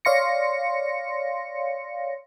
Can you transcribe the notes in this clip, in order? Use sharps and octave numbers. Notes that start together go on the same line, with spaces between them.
C#5 D5 F5 C6 A#6 C#7